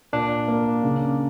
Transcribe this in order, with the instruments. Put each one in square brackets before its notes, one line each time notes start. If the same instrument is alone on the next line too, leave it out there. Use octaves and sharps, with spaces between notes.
[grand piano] A#2 [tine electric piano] D4
[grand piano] A#3
C#3